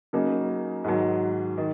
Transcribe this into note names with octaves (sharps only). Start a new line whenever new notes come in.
C#3 F#3 A#3 D#4
G#2 D#3 F#3
D#3